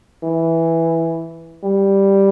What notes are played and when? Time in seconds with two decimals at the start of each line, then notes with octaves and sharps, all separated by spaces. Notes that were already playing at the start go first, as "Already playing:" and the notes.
0.23 E3
1.64 G3